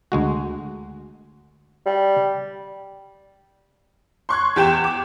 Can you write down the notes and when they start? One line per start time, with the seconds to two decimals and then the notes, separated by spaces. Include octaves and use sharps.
0.12 D2 G#3 F#4
1.85 G3
4.29 C6 C#6 F#6 G#6
4.56 E2 G4 G5 E7
4.84 D6